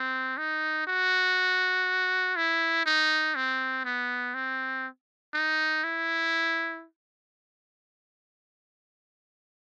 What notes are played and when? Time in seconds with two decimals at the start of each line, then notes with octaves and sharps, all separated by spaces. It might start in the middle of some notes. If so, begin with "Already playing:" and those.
Already playing: C4
0.38 D#4
0.87 F#4
2.36 E4
2.86 D#4
3.35 C4
3.85 B3
4.34 C4
5.34 D#4
5.84 E4